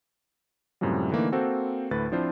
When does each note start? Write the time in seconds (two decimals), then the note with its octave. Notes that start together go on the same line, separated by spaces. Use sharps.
0.81 F#2 A2 C3 F3 G3
1.11 D3 E3 A3 A#3 D#4
1.32 A#3 C4 F#4 A4 C5
1.91 D2 A2 B4 A6
2.12 F3 C4 D4 E4 F4 C5